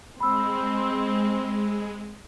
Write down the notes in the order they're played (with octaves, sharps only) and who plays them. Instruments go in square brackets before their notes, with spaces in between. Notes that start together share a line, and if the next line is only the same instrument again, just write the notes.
[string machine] G#3 [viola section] C4 [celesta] B5 E6